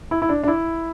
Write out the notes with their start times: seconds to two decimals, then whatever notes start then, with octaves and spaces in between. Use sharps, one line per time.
0.11 E4
0.22 E4
0.29 D4
0.43 D4
0.48 E4